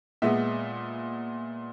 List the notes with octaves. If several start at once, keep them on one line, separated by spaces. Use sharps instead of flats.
A#2 G#3 B3 E5